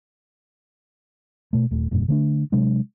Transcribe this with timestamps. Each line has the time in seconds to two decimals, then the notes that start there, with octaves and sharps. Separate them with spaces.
1.53 B2 A3
1.71 D#1 A3
1.91 F1 G2 A#2
2.08 D3 A3 D4
2.52 C3 F#3 G#3 D4